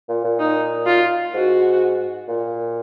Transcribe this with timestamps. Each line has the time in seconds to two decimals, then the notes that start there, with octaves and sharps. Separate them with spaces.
0.09 A#2
0.24 A#2
0.39 D#4
0.86 F4
1.34 G#2 F#4
2.28 A#2